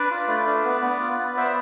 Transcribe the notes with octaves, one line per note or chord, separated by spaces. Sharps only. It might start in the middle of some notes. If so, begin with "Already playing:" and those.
Already playing: D4 B4 D5
F4
A3
D4
B3
B3
F4
B3
B3 C5 E5